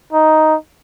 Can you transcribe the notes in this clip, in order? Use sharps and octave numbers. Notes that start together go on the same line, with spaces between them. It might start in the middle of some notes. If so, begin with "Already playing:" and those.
D#4